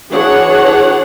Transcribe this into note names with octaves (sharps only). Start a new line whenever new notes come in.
E3 D4 F#4 G#4 C#5 F#5